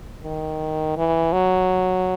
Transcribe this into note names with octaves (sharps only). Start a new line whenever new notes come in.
D#3
E3
F#3